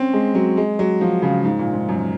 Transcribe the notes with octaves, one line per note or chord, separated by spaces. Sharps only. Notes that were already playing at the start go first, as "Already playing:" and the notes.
Already playing: C4 C#4
G#3
F#3
G#3
F#3
F3
C#3
G#2
A#2
G#2
F#2